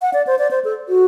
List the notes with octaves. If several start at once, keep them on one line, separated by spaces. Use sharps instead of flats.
F#5
D5
C5
D5
C5
A4
F#4